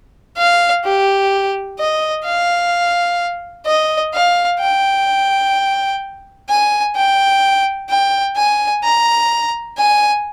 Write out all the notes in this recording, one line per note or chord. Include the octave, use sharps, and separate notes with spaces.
F5
G4
D#5
F5
D#5
F5
G5
G#5
G5
G5
G#5
A#5
G#5